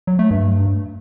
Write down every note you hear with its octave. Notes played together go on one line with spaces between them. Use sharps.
F#3
A3
G2